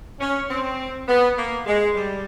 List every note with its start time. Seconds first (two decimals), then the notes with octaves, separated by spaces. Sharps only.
0.20 C#4
0.49 C4
1.08 B3
1.37 A#3
1.66 G#3
1.95 G3